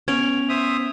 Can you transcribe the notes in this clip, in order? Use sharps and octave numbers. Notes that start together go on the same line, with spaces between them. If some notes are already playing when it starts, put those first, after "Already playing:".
B3 C#4 G#6 D7 F7
C5 E5 D#6